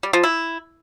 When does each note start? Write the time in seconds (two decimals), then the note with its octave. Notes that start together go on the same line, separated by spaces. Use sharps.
0.03 G3
0.13 F3
0.23 E4